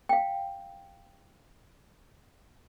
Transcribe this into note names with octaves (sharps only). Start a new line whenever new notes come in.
F5 G5